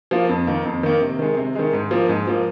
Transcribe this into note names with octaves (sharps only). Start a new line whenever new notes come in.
F3 A#3 F4
F2
D#3 A#3
F2
D#3 A#3
C3
D#3 G#3
C3
D#3 G#3
G#2
F3 A#3
G#2
F3 A#3